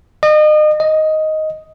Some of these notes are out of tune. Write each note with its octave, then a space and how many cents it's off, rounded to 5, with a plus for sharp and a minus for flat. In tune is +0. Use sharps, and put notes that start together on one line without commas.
D#5 -35
D#5 +5